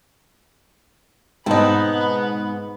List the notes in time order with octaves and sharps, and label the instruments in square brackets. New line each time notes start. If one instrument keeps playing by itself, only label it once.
[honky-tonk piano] G#2 [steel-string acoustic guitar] B2 A5 [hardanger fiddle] B3 B4 [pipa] C4 D#4